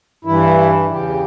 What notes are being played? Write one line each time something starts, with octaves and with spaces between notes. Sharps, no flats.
G2 E3 E4
E2 C#3 E3 G4